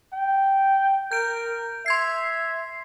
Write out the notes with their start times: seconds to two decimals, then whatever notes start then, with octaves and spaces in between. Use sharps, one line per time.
0.13 G5
1.11 A#4 G6 D7
1.86 E5 C6 G#6 C7